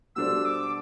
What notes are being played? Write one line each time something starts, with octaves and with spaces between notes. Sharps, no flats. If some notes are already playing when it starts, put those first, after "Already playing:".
B2 G3 D4 A4 C5 E6
D6